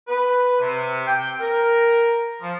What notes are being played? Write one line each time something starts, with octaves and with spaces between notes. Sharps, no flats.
B4
C3
G5
A#4
F3